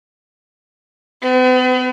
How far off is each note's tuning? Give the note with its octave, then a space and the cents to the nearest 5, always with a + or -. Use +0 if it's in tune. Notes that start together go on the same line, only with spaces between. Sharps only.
B3 +45